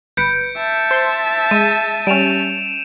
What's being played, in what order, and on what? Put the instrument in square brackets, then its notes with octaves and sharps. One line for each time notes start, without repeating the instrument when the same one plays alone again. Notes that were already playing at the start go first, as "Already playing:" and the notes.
[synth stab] G1 B4 [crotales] G6 C#7 D7
[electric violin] E5 A5
[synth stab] C5 C6
[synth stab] G#3 [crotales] D#7
[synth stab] G3 C#4 [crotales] D7 E7 F7